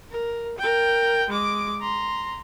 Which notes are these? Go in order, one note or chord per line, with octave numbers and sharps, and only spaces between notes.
A#4
A#4 G5
G#3 D6
A#5 C6